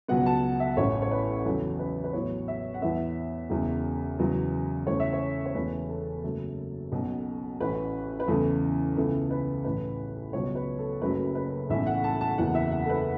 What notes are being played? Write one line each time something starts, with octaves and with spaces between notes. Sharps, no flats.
C#2 B2 F#3 B3 F#5
A5
E5
A1 A2 E3 A3 C#4 C#5
C#5
B4
E2 C#3 F#3 A4
B4
B4
A1 A2 F#3 B3 C#5
E5
F#5
E2 E3 B3 E5
E1 E2 C#3
E2 C#3 F#3 B3
E2 C#3 A3 C#5
E5
C#5
C#5
E1 E2 C#3 A3 C#4 B4
A4
F#1 F#2 F#3 A3
B1 B2 F#3 C#4
A1 A2 A3 C#4 B4
B4
E2 C#3 E3 A3 C#4 A4
C#2 C#3 E3 B3 A4
B4
A1 A2 A3 C#4 B4
C#2 B2 F#3 C#5
B4
A4
F#1 F#2 C#3 F#3 A3 B4
B4
B1 A2 E3 A3 C#4 E5
F#5
A5
A5
F#1 E2 E3 F#5
E5
F#5
A4
B4